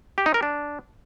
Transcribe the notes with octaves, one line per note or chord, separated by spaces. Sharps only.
G4
D#4
A#4
D4